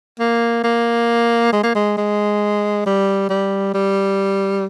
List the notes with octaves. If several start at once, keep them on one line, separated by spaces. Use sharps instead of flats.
A#3
A#3
G#3
A#3
G#3
G#3
G3
G3
G3